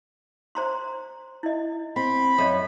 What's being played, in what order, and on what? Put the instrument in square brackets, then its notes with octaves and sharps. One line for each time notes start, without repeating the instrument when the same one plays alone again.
[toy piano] C5 A#5 C6
E4 D#5
[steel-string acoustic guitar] C4 [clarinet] B5
[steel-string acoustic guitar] F#2 [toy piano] A4 D#5